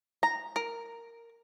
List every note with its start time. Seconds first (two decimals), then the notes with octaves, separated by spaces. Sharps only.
0.23 A#5
0.56 A#4